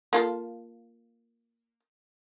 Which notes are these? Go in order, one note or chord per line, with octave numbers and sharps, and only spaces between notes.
A#3 F4 A4